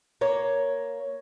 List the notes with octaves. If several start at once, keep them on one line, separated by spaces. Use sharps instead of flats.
A#3 C#5